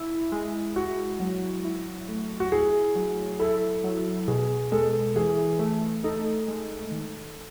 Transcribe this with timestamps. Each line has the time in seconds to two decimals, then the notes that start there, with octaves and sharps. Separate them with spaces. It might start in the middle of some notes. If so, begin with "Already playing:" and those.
Already playing: E4
0.32 G#3
0.76 E4 F#4
1.20 F#3
1.64 E4
2.08 A3
2.40 F#4
2.52 E4 G#4
2.95 F#3
3.39 E4 A4
3.84 F#3
4.28 B2 G#4
4.72 G#3 A4
5.16 E3 G#4
5.59 A3
6.04 D#4 A4
6.48 G#3
6.92 D#3